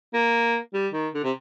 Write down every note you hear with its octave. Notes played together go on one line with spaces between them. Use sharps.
A#3
G3
D#3
D3
C3